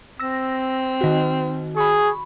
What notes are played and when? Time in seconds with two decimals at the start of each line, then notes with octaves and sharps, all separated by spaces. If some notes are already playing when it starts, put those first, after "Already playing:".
0.20 C4 E6 A#6
1.01 D#3 F#4
1.77 G#4 B5 C#6